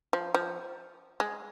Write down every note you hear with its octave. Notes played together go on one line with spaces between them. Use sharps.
F3
F3
G#3